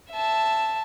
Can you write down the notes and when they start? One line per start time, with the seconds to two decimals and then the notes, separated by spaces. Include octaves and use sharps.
0.11 E5 A5